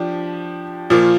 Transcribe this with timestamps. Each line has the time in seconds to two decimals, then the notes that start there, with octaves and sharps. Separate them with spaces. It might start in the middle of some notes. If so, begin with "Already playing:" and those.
Already playing: F3 D4 G4
0.90 A#2 F3 A#3 F4